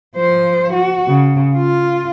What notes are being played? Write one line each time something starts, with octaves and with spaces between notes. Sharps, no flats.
F3 C5
F#4
C#3
F4